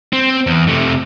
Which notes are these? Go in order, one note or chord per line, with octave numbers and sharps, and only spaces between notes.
C4
E2
C3 A3